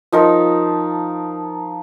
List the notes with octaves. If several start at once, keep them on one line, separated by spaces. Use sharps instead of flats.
F3 D#4 A#4